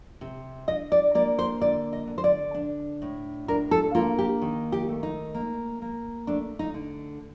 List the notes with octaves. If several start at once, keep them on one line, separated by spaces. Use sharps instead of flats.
C3
D4 D#5
D5
A#3 D5
C5
D3 D5
D#5
D3
C5
D5
D4
A2
D4 A#4
A4
A#3 F4
G4
D#3
G4
A3
D#4
A#3
A#3
A3 D4
D#4
D3